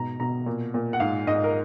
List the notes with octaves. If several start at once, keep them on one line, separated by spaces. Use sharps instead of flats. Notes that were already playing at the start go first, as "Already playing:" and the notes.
Already playing: G#2 B2 A#5
B2 A#5
A#2
A#2
F#5
G#2 F5
G#2 D#5
A#4